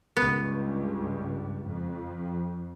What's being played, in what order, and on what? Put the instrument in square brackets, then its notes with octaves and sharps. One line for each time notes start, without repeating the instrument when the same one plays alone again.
[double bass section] C#2 G2 [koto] B3
[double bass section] F2